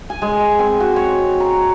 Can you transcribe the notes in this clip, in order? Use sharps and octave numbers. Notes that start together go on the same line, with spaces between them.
G#5
G#3
C4
F#4
C#5
A#5